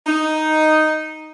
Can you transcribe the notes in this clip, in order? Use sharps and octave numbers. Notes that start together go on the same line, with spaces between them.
D#4